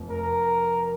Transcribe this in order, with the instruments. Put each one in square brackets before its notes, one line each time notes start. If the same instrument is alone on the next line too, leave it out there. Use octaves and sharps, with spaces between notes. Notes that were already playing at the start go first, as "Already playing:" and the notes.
Already playing: [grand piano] F1 F2
[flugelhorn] A#4